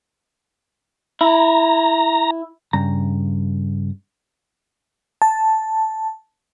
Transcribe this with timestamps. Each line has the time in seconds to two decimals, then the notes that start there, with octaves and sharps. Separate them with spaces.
1.21 E4 A#5
2.73 G2 C#3 A#5
5.22 A5